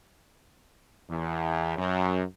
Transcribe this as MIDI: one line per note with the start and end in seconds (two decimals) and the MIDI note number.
1.10 1.74 40
1.77 2.22 42